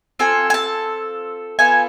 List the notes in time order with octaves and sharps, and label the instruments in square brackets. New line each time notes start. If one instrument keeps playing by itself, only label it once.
[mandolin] C4 F4 A4 G#5
G#5
A5
B3 F4 A4 G#5